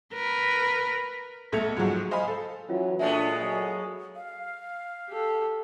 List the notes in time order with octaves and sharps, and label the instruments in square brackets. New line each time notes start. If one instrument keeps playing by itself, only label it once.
[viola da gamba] A#4 B4
[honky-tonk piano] B1 A3 A5 G#6 C#7 F7
G#2 F3 F#3 G#3
C5 D#5 F5 G#5 B5
A4
[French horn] E3 [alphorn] F#3 [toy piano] C#4 F4
[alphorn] A#2 [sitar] G#3 A3 B3 [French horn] D4 [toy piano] E5 A5
[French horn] F#3 [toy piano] D#5 G#5
[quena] F5
[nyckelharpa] G4 A4